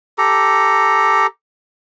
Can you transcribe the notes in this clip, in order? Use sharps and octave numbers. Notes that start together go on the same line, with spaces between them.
G4 A4 A#5